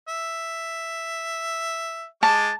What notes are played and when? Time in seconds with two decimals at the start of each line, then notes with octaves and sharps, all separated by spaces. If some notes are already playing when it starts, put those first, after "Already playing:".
0.09 E5
2.23 G#3 A5 D6